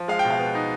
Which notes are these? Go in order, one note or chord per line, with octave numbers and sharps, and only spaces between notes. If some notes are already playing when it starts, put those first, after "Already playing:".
Already playing: F3
G#3 F5
G5
B2
F5
B3
D#4